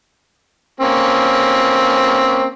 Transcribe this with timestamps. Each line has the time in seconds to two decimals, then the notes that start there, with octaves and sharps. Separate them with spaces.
0.80 A#3 C4 C#4